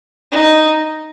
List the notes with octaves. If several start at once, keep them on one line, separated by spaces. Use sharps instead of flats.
D#4